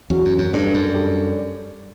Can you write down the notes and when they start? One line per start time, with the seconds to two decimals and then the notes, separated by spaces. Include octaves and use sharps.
0.10 E2 F#3 C#4 F#4
0.25 F#2
0.38 F#2
0.52 G2 G3 D4 A4 D5
0.74 F#2
0.94 G3 D4 A4 D5